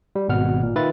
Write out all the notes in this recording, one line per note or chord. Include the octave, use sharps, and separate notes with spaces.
G3
G#1 B2 F#5 F6
A#2
D#3 F4 B4 E5 A6